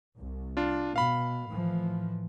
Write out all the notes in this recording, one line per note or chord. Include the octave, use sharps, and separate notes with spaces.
C2
D4 F4
B2 F5 B5
A2 E3 F3